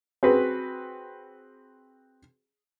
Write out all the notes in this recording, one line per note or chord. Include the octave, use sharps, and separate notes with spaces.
C4 F#4 G#4 B4